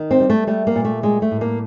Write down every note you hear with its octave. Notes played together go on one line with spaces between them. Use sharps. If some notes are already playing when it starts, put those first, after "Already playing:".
Already playing: D#3
C4
G3
A3
G3 A3
A#3
A#2
A3
G3 G#3
A3
A2
A#3